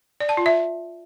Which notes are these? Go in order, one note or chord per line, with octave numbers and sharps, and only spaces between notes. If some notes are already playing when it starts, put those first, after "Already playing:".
D5
A5
F4
E5